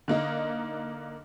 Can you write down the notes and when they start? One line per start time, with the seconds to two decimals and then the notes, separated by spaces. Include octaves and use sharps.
0.08 D3 A#3 D#4